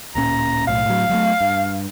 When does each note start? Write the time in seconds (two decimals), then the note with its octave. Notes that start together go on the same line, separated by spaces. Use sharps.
0.15 D1 A#2 C#4 A#5
0.67 B1 A2 F5
0.86 A2 F#3
1.09 F#3 G#3 A3
1.41 G2